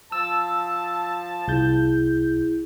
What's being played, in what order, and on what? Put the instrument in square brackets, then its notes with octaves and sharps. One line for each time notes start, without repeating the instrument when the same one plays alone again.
[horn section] F3 A5 [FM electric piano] E6
[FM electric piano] C2 G6 [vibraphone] E4 G#4